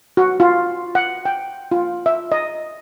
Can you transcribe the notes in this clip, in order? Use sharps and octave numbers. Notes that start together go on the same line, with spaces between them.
F#4
F4
F#5
G5
F4
E5
D#5